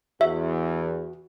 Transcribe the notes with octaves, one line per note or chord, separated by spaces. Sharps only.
E2 F#4 E5